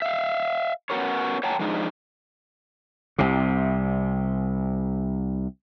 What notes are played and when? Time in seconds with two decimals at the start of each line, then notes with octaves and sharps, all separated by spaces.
0.02 E5 F5
0.90 B3 C#4 F4 F#4 A#4 C#5
1.43 C#5 F#5 G5 A5 A#5
1.60 F3 G#3 D4 D#4
3.18 C2 C3